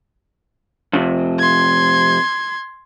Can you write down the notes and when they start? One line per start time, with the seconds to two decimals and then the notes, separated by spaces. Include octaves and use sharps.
0.93 F2 C3
1.39 C6 G#6